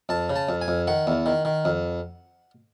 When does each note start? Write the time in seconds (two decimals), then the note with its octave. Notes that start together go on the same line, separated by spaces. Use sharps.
0.09 F2 A5
0.30 C#3
0.36 A5
0.49 F2
0.62 G#5
0.68 F2
0.88 D#3 F#5
1.07 E2
1.26 D#3
1.45 D#3
1.65 F2